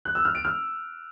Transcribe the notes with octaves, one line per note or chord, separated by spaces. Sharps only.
F#6
E6
F6
D7
F6